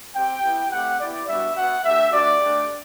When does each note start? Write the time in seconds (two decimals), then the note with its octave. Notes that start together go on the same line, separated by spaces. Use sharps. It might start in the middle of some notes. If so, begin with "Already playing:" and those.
0.15 C4 G4 G5
0.43 B3 E4 G4
0.71 A3 C4 G4 F#5
0.99 B3 E4 G4 D5
1.28 G3 B3 D4 F#4 E5
1.56 B3 F#4 F#5
1.85 A3 D4 G4 E5
2.12 A3 D4 F#4 D5
2.41 A3 D4 G4